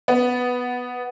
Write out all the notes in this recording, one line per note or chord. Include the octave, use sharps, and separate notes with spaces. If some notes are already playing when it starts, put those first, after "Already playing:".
B3